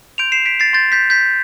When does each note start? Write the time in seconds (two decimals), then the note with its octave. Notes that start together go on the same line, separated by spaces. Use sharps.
0.18 C6 G6 D7 F7
0.32 C7 E7
0.46 B6 D7
0.60 A6 C7
0.73 C6 G6 A6
0.92 G6 B6
1.10 G6 B6